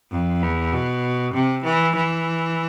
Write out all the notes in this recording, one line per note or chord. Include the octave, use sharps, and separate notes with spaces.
F2
E2
B2
C3
E3
E3